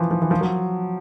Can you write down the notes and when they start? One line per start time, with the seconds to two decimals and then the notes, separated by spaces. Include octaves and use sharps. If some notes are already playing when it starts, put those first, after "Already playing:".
Already playing: E3 F3
0.11 F3
0.22 E3
0.31 F3
0.41 F#3